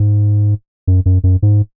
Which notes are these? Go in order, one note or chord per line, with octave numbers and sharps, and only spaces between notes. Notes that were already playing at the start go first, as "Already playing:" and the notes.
Already playing: G#2
F#2
F#2
F#2
G#2